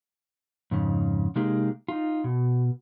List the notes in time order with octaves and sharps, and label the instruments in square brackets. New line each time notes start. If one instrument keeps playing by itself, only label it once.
[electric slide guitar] F2 G#2 C#3
C3 G#3 A#3 D#4 G4 G#4
D#4 F4
B2